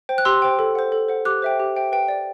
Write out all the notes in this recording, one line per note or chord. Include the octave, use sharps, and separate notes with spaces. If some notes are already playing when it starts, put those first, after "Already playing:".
C5 G5
F#6
G4 C6 E6
C5 G5
A4
C5 F#5
A4
C5 F#5
G4 D6 F#6
C5 E5 G5
G4
C5 E5 G5
B4 G5
D5 G5